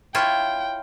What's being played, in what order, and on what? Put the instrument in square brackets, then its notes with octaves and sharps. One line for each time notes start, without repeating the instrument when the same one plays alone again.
[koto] E4 F4 C#5 [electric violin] G5